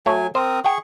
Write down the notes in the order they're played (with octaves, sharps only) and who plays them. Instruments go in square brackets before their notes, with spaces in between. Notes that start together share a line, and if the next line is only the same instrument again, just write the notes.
[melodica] F#3 G#5 [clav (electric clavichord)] A3 C#5
[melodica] C4 A#4 D#6 [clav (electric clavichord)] C5
[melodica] G#4 C#6 [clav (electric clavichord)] F#5 G5